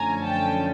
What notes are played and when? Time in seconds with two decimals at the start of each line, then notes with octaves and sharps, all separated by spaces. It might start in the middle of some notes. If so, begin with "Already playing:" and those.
Already playing: F#2 D3 F3 A3 C#4 G#5 A#5
0.25 G5 A5